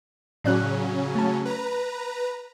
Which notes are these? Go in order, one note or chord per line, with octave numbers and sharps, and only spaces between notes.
A2 C#3 F#3 C#4 D5 F#6
A3 A5
B4 A#5